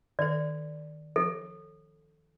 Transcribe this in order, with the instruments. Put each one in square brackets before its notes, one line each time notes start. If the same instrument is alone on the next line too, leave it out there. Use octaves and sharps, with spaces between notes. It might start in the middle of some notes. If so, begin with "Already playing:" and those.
[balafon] D#3 A4 [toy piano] D5
[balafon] F3 [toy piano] A4